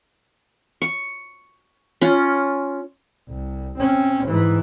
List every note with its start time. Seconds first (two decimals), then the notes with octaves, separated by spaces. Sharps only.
0.82 C#6
2.02 C#4 F4
3.29 C2
3.79 C4 C#4
4.27 G#2 E3